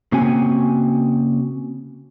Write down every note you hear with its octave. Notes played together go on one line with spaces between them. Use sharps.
C#3 A#3 C4 F#4 G#5